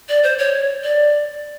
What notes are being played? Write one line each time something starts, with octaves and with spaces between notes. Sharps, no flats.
D5
C5
C#5
D5